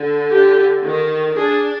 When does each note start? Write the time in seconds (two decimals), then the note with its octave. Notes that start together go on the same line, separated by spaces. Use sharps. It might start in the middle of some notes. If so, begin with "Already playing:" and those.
Already playing: D3
0.31 G4
0.84 D#3
1.37 D4 G#4